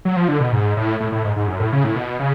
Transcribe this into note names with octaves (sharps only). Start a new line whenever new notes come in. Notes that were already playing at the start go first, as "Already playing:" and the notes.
F#3
F3
D3
B2
G#2
A2
A2
A2
G#2
G#2
F#2
A2
C#3
A2
B2
C#3